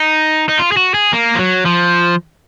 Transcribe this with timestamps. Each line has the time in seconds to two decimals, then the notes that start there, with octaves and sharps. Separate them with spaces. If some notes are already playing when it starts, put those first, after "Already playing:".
Already playing: D#4
0.49 D#4
0.59 F4
0.72 G#4
0.77 F#4
0.94 G#4
1.13 A#3
1.35 F3
1.39 F#3
1.66 F3